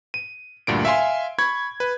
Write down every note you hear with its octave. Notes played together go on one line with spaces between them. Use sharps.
D#7
D2 G2 A#2 D7
E5 F5 G#5 C6
B5 C#6 G#6
B4